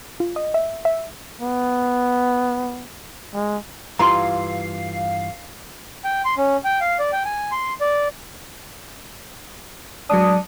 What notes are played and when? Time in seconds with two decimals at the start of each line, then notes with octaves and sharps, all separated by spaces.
0.20 F4
0.36 D#5
0.54 E5
0.85 E5
1.41 B3
3.34 G#3
3.99 G2 E3 F4 F5 A#5 C6
6.04 G5
6.25 C6
6.37 C#4
6.64 G5
6.81 F5
6.99 D5
7.13 G5
7.25 G#5
7.51 C6
7.81 D5
10.10 F#3 G#3 D4 D#6